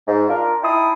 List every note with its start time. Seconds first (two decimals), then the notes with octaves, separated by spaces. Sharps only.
0.07 G#2
0.29 D4 F4 A#4
0.62 D#4 E4 G5 A5 C6 D#6